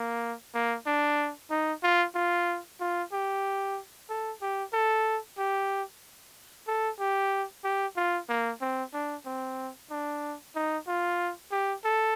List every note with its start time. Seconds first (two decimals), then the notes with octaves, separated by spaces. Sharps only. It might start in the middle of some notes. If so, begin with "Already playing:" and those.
Already playing: A#3
0.54 A#3
0.87 D4
1.51 D#4
1.83 F4
2.15 F4
2.81 F4
3.13 G4
4.09 A4
4.42 G4
4.73 A4
5.38 G4
6.68 A4
7.00 G4
7.64 G4
7.97 F4
8.29 A#3
8.61 C4
8.94 D4
9.26 C4
9.91 D4
10.55 D#4
10.88 F4
11.52 G4
11.85 A4